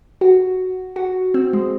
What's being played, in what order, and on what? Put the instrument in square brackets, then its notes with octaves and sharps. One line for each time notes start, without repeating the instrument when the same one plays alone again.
[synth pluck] F#4
F#4
C4
G#3